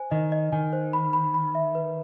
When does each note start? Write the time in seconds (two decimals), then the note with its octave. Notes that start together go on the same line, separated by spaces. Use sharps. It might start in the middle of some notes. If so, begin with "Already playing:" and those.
Already playing: C5 G#5
0.11 D#3 D#5
0.32 D#5
0.52 D#3 G#5
0.73 C5
0.93 B5
1.13 B5
1.34 B5
1.55 E5
1.75 B4